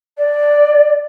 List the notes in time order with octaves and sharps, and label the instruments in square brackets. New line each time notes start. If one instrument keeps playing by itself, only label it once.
[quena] D5